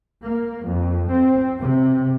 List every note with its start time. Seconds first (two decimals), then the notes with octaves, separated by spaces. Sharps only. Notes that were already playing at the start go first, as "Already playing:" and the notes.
0.24 A#3
0.68 F2
1.11 C4
1.59 C3